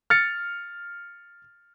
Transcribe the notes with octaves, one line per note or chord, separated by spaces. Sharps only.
F6 A6 C#7